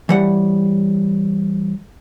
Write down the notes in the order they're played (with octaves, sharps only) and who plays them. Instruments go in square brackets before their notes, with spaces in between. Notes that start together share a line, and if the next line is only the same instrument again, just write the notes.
[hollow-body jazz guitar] E3 G3 F#5